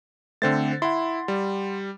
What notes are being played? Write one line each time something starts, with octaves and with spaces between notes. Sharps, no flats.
D3 A3 C4 C5 A6
E4 F#5 C6
G3